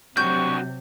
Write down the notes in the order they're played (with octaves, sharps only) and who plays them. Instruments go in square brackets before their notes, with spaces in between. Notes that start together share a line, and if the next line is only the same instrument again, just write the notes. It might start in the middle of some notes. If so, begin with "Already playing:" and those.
[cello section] C3 F#3 [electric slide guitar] D4 F#4 G4 [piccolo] C#6 [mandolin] G6